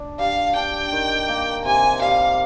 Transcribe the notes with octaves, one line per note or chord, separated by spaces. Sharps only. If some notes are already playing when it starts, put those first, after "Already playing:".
Already playing: D4
G3 F5
D4 G5
D#3
A#3
C3 G#5
G3 F5